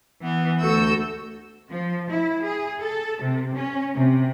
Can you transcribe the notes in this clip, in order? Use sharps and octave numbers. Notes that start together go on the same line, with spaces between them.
E3 B3
D2 F#4 A4 E6 G6
F3
E4
G#4
A4
C3
C#4
C3